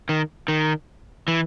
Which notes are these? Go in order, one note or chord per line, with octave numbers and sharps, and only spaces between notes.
D#3
D#3
E3